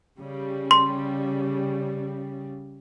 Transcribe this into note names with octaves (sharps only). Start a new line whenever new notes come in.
C#3 G3
C6